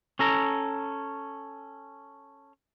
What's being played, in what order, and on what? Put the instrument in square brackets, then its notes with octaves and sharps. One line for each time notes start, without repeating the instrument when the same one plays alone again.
[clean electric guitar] C#4 A4 A#5